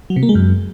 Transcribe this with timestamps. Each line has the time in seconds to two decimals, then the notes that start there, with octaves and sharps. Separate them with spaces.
0.10 F#3
0.16 C3
0.23 A#3
0.29 G#3
0.35 F#2